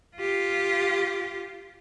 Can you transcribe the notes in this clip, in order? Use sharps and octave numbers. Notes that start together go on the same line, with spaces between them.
F4 G4